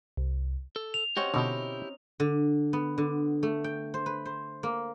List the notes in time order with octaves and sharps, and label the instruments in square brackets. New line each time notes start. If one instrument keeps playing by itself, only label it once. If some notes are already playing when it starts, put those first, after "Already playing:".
[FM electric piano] C2
[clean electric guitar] A4
[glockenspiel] F7
[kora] C4 C#4 F#4 [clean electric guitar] G4 D#5 F#5
[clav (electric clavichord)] B2 D3 [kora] D#4 [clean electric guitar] E4 G4
[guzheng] D3
B3
D3
A3
G5
C5
B4
C5
A#3